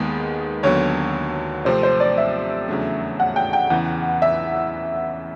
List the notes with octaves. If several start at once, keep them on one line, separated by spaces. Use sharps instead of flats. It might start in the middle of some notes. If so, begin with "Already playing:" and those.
Already playing: D#2 D#3 G#3 B3
D#2 D3 F#3 B3 C#5
C3 F3 A3 C4 C5
C5
D5
E5
E2 C#3 F#3 A3 D4
F#5
G5
G5
E2 C#3 E3 F#5
E5